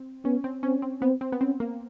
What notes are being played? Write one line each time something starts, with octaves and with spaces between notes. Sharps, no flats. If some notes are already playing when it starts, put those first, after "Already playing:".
Already playing: C4
B3 C#4
C4
C4 C#4
C4
B3 C4
C4
B3
C4 C#4
A#3